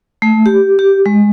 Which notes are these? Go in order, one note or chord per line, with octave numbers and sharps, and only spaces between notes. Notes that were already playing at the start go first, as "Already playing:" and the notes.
A3
G4
G4
G#3